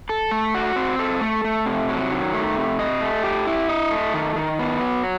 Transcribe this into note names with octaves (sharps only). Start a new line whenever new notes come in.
A4
A3
F#4
C4
A4
A3
A3
C3
F#3
D#3
A3
C3
D#5
A3
G4
E4
D#5
A3
D#3
D#3
B3
F#3